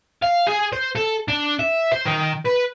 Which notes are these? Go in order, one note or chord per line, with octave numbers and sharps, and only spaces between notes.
F5
G#4
C5
A4
D4
E5
C5
D#3
B4